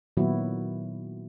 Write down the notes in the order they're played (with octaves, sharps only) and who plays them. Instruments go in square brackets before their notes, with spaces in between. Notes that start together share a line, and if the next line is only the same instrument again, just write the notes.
[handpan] A#2 D#3 F#3 B3 E4 F#4